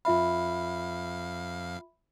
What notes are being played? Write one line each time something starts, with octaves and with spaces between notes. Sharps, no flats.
F2 F4 E5 F5 B5